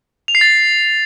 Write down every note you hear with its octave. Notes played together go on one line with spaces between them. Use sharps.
F7
C7
A6